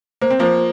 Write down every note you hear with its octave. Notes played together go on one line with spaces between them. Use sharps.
A#3 C5
C4
F3 A#3 C5